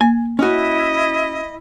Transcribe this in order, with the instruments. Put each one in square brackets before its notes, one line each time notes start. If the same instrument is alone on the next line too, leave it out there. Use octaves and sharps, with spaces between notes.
[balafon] A#3 [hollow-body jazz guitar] G#5
[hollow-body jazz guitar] C#4 F#4 [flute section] E4 [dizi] D#5